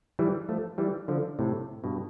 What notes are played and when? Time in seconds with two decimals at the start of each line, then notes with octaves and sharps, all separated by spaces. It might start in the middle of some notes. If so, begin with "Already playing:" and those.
0.19 E3 G3
0.49 F3 A3
0.78 E3 G3
1.08 D3 F3
1.39 A2 C3
1.84 G2 B2